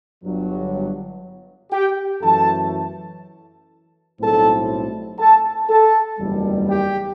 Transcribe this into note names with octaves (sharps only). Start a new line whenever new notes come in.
G1 G2 F#3
G4 G5
F#2 E3 A3 A4 A5
B1 A2 G3 C4 E4 A4 A5
A4 A5
A4 A5
F#1 E2 D#3 G3
G4 G5